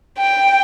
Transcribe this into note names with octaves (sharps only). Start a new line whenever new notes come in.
G5